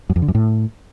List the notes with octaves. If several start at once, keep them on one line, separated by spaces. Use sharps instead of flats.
F#2
F2
D3
F#2
A2